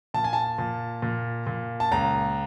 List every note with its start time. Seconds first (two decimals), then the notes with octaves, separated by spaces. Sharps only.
0.14 A#2 A5
0.24 G#5
0.33 A5
0.58 A#2
1.02 A#2
1.47 A#2
1.80 A5
1.91 C#2 A#5